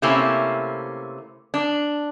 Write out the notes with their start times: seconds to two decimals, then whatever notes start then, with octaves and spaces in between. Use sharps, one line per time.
0.02 C3 A3 A#3 C4 C#4 E4
1.54 D4